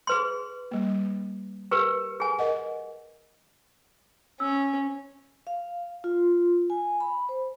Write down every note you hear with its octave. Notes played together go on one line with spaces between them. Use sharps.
G#4 B4 C6
G3 A#3
G4 A#4 B4
G#4 G#5
A#4 D#5 F#5
C#4 E6
F5
F4
G#5
B5
C5